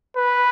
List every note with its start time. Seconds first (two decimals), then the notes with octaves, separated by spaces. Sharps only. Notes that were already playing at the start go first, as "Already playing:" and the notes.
0.16 B4